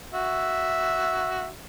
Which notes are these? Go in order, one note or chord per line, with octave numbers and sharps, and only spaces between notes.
F#4 E5